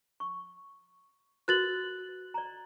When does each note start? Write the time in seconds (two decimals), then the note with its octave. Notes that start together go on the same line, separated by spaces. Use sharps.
0.20 C#6
1.48 F#4 A#4 B4 F#6 A6 F#7
2.34 D5 A#5